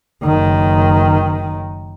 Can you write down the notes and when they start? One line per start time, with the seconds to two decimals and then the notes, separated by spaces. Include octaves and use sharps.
0.23 F#1 D#3